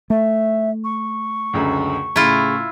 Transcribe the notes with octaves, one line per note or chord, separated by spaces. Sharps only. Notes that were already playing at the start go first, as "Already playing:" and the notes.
A3 E5
C#6
C#2 F#2 D3
A2 C#3 E4 F4